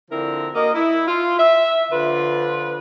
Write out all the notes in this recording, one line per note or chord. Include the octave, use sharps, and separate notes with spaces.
D3 F3 C4 D4 E4 A#4
A#3 F#4 A#4 D#5
E4
F4
E5
D3 F3 F4 B4